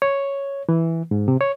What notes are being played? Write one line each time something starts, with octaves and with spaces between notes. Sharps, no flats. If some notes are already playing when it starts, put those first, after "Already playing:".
C#5
E3
G#2
C3
C#5